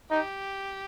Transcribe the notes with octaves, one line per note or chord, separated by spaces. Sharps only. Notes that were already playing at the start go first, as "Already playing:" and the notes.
D#4 G4